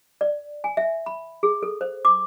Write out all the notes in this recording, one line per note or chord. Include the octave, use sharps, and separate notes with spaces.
D5
G#5
E5
B5
G#4
A4
C5
D6